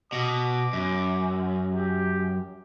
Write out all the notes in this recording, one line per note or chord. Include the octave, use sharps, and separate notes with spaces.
B2 D6
F#2
G4